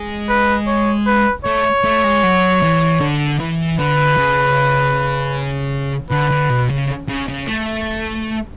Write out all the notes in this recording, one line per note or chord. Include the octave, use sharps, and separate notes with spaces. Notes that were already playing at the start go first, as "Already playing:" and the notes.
Already playing: G#3
B4
C#5
B4
A3 C#5
A3
G#3
F#3
E3
D3
E3
D3 B4
C#3
D3 B4
D3
B2
C#3
C#3
C#3
A3